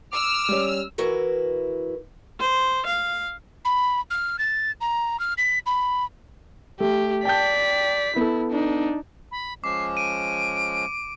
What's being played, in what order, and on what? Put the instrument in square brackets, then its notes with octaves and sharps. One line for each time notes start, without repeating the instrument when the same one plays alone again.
[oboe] D6 [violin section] E6 F6
[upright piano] G3 C#4
[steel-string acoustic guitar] E3 E4 F#4 A#4 B4
[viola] C5
F5
[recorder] B5
F6
A6
A#5
F6
B6
B5
[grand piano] A3 [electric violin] G4
[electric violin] D5 B6 [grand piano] G5 A5 G6
[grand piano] B3 A4 [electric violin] E4
[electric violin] D4 D#4
[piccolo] B5
[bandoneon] F3 G#3 C#4 [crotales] D6 [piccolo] C7
[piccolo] D7 [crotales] D#7